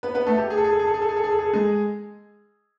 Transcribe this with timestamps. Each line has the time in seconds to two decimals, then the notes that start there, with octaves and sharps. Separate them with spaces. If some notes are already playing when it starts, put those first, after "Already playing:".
0.03 B3 B4
0.15 B3 B4
0.27 A3 A4
0.38 G4
0.50 G#4
0.57 A4
0.64 G#4
0.72 A4
0.79 G#4
0.87 A4
0.94 G#4
1.02 A4
1.09 G#4
1.16 A4
1.24 G#4
1.32 A4
1.39 G#4
1.45 A4
1.53 G#3 G#4